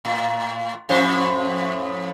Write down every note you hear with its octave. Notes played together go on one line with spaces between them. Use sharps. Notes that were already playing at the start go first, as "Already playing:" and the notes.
A2
F2 A2 C5